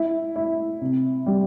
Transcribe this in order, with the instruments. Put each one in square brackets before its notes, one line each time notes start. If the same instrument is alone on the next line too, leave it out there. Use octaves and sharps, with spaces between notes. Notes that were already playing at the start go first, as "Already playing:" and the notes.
Already playing: [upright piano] E4
E4
C3
G3